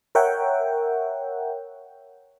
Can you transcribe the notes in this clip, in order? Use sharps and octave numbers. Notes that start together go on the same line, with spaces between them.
A#4 C#5 E5 F#5 G5